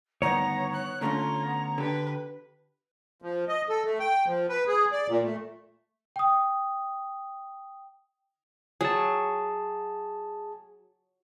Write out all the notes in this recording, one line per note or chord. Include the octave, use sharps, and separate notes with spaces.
D2 G2 D#3 B3 C#5 A#5
F#6
D3 A3 C#4 F4 A#5
B3
D3 G4 B4
F3
D#5
A4
A3
G5
F3
B4
G#4
D5
A#2
A3
G5 D#6
F#3 G#4 A5